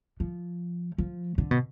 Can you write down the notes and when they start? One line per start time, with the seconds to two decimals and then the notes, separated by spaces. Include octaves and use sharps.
0.20 F3
0.98 F3
1.38 D3
1.51 B2